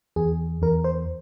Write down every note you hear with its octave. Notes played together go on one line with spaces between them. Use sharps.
E2 G#4
E2 A#4
C5